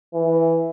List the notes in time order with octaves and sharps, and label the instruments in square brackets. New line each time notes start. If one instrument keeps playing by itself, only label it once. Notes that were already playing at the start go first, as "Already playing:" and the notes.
[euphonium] E3